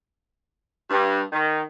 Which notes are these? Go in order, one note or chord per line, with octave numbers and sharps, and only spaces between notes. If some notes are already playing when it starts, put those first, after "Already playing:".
G2
D#3